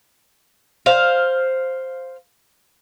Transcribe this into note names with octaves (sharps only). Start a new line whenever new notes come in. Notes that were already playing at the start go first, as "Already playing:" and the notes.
C5 F5